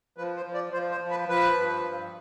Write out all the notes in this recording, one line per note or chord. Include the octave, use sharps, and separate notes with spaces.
F3 B4
C5
F3
D5
F3 C5
C5
F3
B4
F3 B4
G2
G2